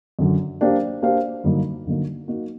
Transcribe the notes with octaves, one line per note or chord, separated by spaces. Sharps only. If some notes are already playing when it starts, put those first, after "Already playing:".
F#2 D3 F#3
A#3 D4 G4 C5 F5
A#3 D4 G4 C5 F5
G2 D3 F#3 A#3 D#4
G2 D3 F#3 A#3 D#4
A#3 D#4 F#4